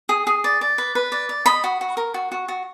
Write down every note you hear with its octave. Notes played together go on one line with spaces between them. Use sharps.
G#4
G#4
D5
D5
B4
B4
D5
D5
D#5 B5
F#4
F#4
A#4
F#4
F#4
F#4